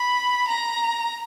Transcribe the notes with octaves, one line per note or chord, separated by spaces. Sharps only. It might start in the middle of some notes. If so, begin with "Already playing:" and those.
Already playing: B5
A#5